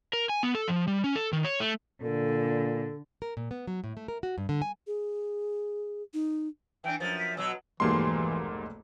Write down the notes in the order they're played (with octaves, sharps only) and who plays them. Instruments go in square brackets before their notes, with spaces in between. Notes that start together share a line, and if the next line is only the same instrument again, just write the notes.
[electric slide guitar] A#4
G#5
B3
A4
F3
G3
C#4
A4
D#3
C#5
A3
[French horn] A#2 [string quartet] D3 [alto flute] A4
[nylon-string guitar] A#4
A#2
B3
F#3
A2
A3
A#4
F#4
G2
D3
G#5
[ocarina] G#4
D#4
[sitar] E3 D4 [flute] G5
[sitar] F#2 F3 [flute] A6
[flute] B6
[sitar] B2 F#3 [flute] E6
[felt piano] F1 B1 G4 [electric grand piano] G#2 A#3 C6 [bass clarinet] E3